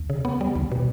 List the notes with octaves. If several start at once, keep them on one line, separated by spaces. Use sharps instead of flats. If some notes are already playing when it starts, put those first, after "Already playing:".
Already playing: D#2
C#3
B3
G3
D#2
B2